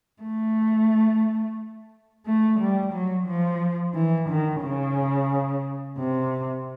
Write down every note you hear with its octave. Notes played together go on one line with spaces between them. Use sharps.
A3
A3
G3
F#3
F3
E3
D#3
C#3
C3